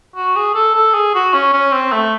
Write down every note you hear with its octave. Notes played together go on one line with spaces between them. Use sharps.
F#4
G#4
A4
A4
G#4
F#4
C#4
C#4
C4
A3